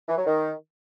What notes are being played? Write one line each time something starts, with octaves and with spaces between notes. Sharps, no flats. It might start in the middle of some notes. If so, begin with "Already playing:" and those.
E3
F#3
D#3